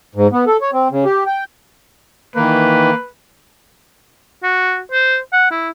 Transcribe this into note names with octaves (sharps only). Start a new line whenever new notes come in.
G#2
B3
A4
C#5
C4
C#3
G4
G5
D#3 E3 A#3 B4
F#4
C5
F#5
E4